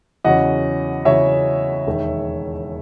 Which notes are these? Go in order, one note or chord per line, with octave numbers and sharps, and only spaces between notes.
E2 C#3 F#3 C#4 D#5 F#5
E2 C#3 F#3 C#4 C#5 E5
E1 D#2 D#3